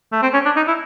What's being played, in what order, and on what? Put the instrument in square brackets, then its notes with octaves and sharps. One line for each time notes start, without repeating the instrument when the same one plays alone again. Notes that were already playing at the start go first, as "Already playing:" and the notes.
[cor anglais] A3
C4
C#4
D4
D#4
E4